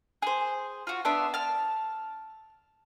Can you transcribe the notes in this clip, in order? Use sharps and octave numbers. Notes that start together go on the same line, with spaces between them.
G#4 C5
F4 F#4
B3 D4 E5 C6
A5 F6